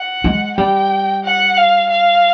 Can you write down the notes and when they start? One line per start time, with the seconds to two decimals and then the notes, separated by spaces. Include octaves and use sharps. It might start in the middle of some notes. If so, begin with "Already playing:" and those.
Already playing: F#5
0.24 G#3
0.57 G3 G5
1.24 F#5
1.57 F5
1.89 F5